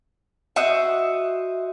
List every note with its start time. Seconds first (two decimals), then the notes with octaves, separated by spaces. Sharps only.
0.56 F#4 C5 D#5 E5